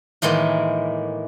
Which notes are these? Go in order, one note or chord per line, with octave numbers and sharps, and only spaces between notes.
A2 D#3 E3 G#3 A#3